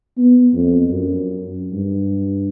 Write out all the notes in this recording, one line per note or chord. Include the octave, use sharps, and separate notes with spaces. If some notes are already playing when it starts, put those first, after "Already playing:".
B3
F2
F#2
G2